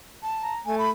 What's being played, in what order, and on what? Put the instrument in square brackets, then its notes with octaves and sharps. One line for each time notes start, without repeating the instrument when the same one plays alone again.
[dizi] A5
[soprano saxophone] A#5
[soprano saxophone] A3 [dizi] G#5
[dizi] B5